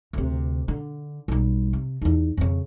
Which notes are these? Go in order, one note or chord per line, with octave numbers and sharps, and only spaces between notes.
D2 C3
D3
B1 G3
C3
E2 D#4
F2 C#3